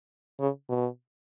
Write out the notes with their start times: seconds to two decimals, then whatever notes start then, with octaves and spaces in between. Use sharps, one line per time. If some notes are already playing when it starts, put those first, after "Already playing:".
0.40 C#3
0.69 B2